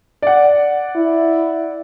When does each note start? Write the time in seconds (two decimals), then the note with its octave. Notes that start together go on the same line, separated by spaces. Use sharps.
0.22 D5 F#5
0.96 E4